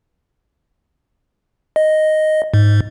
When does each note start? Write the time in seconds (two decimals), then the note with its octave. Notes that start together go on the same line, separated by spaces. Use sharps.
1.76 D#5
2.54 G#2